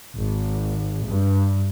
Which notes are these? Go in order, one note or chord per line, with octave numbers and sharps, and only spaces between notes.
G#1
G2